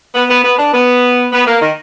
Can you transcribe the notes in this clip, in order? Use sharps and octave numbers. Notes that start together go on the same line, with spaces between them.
B3
B3
B3
D4
B3
B3
A#3
D#3